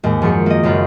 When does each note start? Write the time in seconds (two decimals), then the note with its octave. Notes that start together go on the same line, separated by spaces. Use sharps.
0.04 D#2 G#2
0.22 F#2 F3 G#4 C#7
0.46 A#3 D#5
0.63 F#1 F#2 F4 B5